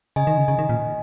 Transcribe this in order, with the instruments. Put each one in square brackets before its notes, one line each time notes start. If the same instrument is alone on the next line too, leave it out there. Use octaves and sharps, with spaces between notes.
[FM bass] C#3 [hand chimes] D#5 G#5
[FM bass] D#3
C#3
C#3
D#3
A#2